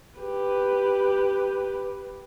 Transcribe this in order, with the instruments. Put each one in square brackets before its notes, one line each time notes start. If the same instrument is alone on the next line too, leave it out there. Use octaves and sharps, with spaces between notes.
[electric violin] G4 B4